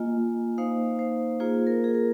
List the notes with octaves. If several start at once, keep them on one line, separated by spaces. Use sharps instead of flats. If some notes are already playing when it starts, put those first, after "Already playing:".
Already playing: A#3 F4 D#5 G#5
A#3 D#4 C5 F5
C5 F5
A#3 F4 G#4 C5
A#4
G#4
A#4